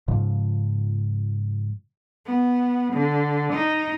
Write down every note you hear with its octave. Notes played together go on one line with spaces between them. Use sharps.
G#2 C#3 F3
B3
D3
D#4